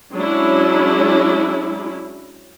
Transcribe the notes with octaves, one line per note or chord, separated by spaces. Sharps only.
F#3 G#3 C#4 D4 E4